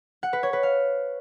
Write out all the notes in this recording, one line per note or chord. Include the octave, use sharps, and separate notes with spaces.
F#5
B4
C#5
B4
F5